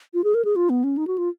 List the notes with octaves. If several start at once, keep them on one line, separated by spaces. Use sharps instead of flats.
F4
G#4
A#4
G#4
F4
B3
C#4
D#4
F#4
F4